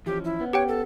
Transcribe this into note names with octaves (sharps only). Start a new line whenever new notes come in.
E3 F3 C#4 G4
E4
B3 C#4
G4 C#5 F#5 G5
A4